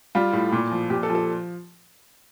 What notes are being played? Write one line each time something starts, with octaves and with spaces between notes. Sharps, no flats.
G3 F4
A2
A#2
F3
A#2 G4
A4
F3
A4